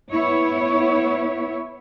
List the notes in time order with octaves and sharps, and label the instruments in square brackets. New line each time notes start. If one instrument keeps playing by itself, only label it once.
[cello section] B3 E4 C#5